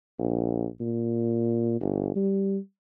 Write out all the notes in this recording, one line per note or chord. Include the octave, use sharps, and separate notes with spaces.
A#1
A#2
G1
G3